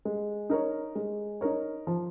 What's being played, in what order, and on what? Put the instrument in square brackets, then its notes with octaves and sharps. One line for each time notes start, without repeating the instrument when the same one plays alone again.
[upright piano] G#3
D#4 A#4 C#5
G#3
D#4 A#4 C#5
F3